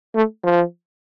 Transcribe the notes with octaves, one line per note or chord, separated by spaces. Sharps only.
A3
F3